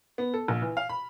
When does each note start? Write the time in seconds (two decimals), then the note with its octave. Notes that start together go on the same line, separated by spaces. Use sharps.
0.18 B3
0.34 A4
0.48 A#1
0.62 E3
0.77 F5
0.89 B5